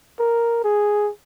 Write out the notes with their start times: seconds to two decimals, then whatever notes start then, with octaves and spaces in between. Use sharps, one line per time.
0.20 A#4
0.64 G#4